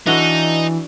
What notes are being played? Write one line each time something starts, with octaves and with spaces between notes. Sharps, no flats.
E3 D4 D#4 F#4 A4